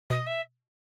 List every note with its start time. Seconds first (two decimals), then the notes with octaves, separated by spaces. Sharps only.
0.10 B2 D#5
0.26 E5